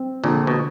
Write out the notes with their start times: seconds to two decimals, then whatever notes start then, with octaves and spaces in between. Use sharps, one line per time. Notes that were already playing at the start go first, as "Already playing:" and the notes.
Already playing: C4
0.24 A#1 A#2 D3
0.47 B2